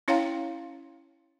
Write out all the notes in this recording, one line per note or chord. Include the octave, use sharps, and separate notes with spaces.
C#4 E4 C#5 F5 G5 A#5